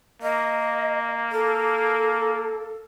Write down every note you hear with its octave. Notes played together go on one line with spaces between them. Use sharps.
A#3 D#5
A4